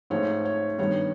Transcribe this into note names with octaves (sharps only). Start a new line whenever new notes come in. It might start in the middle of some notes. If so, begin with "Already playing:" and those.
G#2 F3 A3 C4 C#5
C#5
G2 D#3 G3 B3 C#5